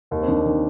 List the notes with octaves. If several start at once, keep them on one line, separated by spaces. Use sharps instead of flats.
D#2 D#4
C4
D#3 D4
D#3 C4